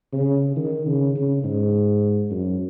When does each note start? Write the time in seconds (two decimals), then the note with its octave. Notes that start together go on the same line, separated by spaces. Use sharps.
0.13 C#3
0.56 D#3
0.86 C#3
1.15 C#3
1.43 G#2
2.31 F#2